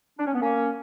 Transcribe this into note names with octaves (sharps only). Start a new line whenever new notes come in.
D4
C#4
B3
A#3 C#4